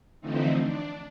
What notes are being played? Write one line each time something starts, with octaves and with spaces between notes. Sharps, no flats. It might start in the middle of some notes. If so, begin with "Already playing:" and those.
D3 E3 F3 A3 C4 D#4
D4